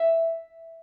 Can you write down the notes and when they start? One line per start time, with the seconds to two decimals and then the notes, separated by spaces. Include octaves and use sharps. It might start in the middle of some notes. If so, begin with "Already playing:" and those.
Already playing: E5